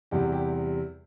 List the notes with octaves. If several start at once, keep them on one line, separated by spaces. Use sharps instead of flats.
E2 C3 G3 G4
G4